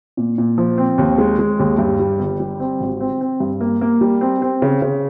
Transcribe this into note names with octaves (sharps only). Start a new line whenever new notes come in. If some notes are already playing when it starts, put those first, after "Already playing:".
A#2
A#2
F3
C4
D#2
G#3
G#3
D#2
G2
G3
G1
G3
C4
G#1
C4
C4
G2
A#3
A#3
G3
C4
C4
C#3
C#3